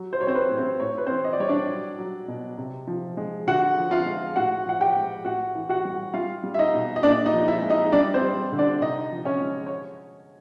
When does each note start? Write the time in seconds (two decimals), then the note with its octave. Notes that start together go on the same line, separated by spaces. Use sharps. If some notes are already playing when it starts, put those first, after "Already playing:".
Already playing: F#3
0.13 C5
0.20 F#3 C#5
0.27 C4 C5
0.35 B4
0.51 A2
0.57 C4 C5
0.80 A2 C#5
0.89 C5
0.98 B4
1.07 C4 C5
1.09 E3
1.24 D#5
1.33 D5
1.40 G3 C#5
1.49 D4 D5
1.69 F#3
1.98 F#3
2.28 B2
2.58 C3
2.87 F3
3.17 G#3
3.47 D3 F#4 F#5
3.77 F3
3.91 F4 F5
4.06 G#3
4.36 A2 F#4 F#5
4.65 F3 F#5
4.81 G4 G5
4.96 G#3
5.25 A2 F#4 F#5
5.55 E3
5.69 F#4 F#5
5.85 G3
6.14 G3 F4 F5
6.44 G3
6.54 E5
6.59 D#4 D#5
6.74 B2
6.96 D#5
7.03 A#2 D4 D5
7.26 D#4 D#5
7.32 F3
7.48 E4 E5
7.62 G#3
7.70 D#4 D#5
7.92 G3 D4 D5
8.14 C4 C5
8.21 G3
8.52 D3
8.59 D4 D5
8.81 C3 D#4 D#5
9.11 F3
9.25 C#4 C#5
9.40 G#3
9.66 C#5